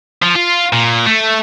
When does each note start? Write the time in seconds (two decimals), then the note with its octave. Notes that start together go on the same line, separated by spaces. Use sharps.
0.23 F3
0.36 F4
0.73 A#2
1.06 A3